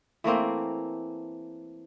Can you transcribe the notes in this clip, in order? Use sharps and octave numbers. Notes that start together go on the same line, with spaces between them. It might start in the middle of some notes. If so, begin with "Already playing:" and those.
E3 A3 A#3 C4